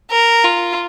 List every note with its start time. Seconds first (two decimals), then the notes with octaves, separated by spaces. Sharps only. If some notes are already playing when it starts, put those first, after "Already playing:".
0.11 A#4
0.44 F4